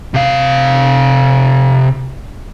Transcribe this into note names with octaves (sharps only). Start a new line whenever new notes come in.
C3 F5